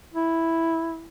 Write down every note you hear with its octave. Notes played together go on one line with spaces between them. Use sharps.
E4